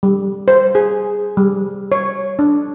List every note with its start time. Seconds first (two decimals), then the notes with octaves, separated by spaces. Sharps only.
0.03 G3
0.48 C5
0.75 G#4
1.37 G3
1.92 C#5
2.39 D4